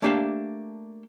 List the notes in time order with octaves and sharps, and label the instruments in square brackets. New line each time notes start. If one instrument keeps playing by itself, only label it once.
[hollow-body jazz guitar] A3 A#3 D4 G4 E5 F5